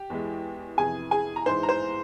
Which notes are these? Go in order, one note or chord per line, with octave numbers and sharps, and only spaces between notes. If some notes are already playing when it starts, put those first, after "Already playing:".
Already playing: G4
E2 E3 G#3
F2 C3 E3 G#4 G#5
G#4 G#5
A#5
G#2 E3 G#3 C5 C6
A#5
C5 C6